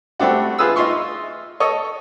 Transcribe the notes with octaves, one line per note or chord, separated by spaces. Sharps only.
G3 A3 C4 D4 F#4
F4 G#4 B4 D#6 E6
D#4 F4 E5 C6 C#6
A4 C#5 D#5